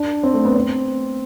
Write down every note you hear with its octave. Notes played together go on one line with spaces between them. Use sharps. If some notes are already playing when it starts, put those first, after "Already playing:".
Already playing: D4
C4
A3
B3
C4